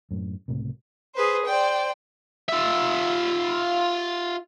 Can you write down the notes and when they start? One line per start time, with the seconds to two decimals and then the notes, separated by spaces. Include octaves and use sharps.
0.11 F#2 A2
0.48 C#2 A2 C3
1.15 G#4 B4 C5
1.46 C5 D5 G5
2.49 F4 E5